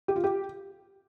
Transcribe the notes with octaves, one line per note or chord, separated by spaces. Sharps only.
G4
F4
G4